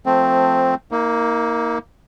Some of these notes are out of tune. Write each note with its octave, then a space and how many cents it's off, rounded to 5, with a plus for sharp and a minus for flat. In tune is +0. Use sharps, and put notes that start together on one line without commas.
F3 +10 A3 +0 C4 +0
A#3 +0 D#4 +45